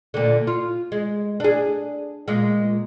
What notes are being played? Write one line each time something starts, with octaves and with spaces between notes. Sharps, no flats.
A#2 D3
F4
G#3
D4 G#4
A#2 G#3